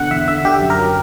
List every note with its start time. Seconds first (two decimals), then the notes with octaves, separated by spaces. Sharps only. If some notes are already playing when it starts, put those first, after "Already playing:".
Already playing: B2 D3 F#5
0.11 E2 E5
0.28 D3 E5
0.45 D3 G4
0.62 F#2
0.70 A#4
0.78 F#3